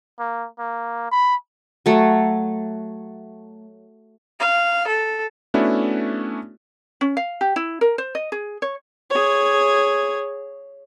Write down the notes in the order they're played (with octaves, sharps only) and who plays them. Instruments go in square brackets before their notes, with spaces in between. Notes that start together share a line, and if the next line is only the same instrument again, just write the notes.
[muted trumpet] A#3
A#3
B5
[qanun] F#3 A3
[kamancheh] F5
A4
[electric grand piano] A3 B3 C#4 D4 E4 F#4
[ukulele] C#4
F5
G4
E4
A#4
C5
D#5
G#4
C#5
[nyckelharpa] G#4 C#5